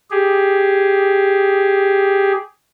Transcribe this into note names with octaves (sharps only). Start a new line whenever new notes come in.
G4 G#4